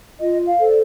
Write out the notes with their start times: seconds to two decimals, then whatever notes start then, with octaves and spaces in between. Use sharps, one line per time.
0.20 F4 D#5
0.45 F5
0.58 A4 C5
0.67 D5